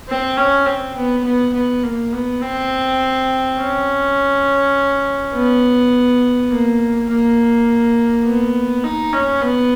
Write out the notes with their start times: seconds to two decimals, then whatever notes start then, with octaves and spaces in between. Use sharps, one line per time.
0.09 C4
0.37 C#4
0.66 C4
0.96 B3
1.25 B3
1.53 B3
1.83 A#3
2.13 B3
2.42 C4
3.59 C#4
5.33 B3
6.50 A#3
7.09 A#3
8.25 B3
8.84 D#4
9.13 C#4
9.42 B3